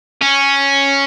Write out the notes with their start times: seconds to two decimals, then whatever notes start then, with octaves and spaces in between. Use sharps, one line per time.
0.22 C#4